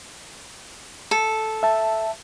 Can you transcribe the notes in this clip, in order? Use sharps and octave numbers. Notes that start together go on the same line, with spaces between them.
A4
E5 A5